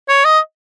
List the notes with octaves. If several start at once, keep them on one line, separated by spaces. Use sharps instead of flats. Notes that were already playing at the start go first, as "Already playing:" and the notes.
C#5
D#5